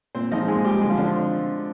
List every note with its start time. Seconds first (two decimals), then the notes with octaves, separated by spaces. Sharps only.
0.15 A#2 C4 C5
0.32 F3 G#3 D#4 D#5
0.48 A#2 G#3 G#4
0.64 F3 G3 G#3 G4
0.81 D3 G#3 G#4
0.90 F3 F4
0.98 D3 G#3 D4
1.07 C4